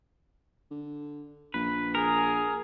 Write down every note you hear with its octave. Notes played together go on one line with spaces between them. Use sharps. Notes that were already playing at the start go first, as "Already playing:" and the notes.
D3
A#1 B4
G#4 A#4